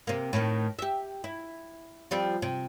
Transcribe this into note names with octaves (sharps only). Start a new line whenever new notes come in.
C3 A#3
A2 D#3
G4 E5
E4
F3 G3 C4
C3